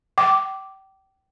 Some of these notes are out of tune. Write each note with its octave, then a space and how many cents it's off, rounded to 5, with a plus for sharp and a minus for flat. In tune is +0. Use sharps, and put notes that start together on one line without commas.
G5 -30 D6 +0